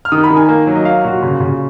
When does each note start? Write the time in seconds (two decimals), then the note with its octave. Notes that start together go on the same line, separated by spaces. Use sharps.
0.05 F6
0.12 D#3 D#6
0.24 B5
0.31 D#3
0.36 G#5
0.49 A#3
0.67 F#3
0.75 D#5
0.85 A#3 F5
1.04 A#2 F#4
1.23 C#3
1.40 C#3